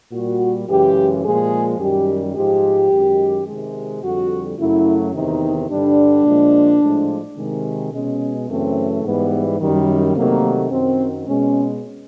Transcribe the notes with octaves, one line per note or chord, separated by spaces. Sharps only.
A#2 G3 F#4
F#2 C#3 E3 G#3 G4
A#2 F3 G#3 G#4
F#2 D#3 G3 G4
G#2 F3 G#3 G4
F#2 D#3 G#3
C3 D#3 G#3
F2 D3 G3 F#4
F#2 C#3 F#3 A3 E4
E2 C3 D#3 D#4
G2 D3 G3 D4
A#2 F3 G#3
A2 F3 G#3
C3 D#3 G#3
B2 G#3 C#4
F#2 C#3 E3 A3 C4
G#2 E3 G3 B3
F#2 D#3 G3
C3 D#3 F#3 A3 A#3
F#2 D#3 F#3 C4
B2 G#3 C#4